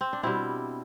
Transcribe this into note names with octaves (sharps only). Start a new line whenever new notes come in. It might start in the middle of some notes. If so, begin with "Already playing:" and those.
C4
D4
B2 G3 C4 E4